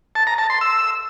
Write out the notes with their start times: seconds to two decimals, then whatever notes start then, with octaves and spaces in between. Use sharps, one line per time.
0.15 A5
0.27 A#5
0.38 A5
0.50 C6
0.61 E6